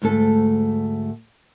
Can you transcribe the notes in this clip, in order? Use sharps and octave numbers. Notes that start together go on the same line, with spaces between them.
D2 G#2 A3 A4